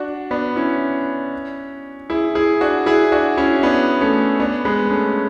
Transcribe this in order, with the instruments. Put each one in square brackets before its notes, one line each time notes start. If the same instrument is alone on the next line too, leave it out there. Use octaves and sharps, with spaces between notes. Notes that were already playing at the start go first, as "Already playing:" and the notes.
Already playing: [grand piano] D4 F#4
B3 D4
C#4 E4
E4 G#4
E4 G#4
D4 F#4
E4 G#4
D4 F#4
C#4 E4
B3 D4
A3 C#4
B3 D4
G#3 B3
A3 C#4